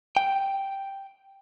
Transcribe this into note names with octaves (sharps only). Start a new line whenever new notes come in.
G5